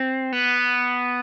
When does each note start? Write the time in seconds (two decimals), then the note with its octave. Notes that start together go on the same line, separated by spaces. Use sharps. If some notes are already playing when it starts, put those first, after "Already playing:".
Already playing: C4
0.32 B3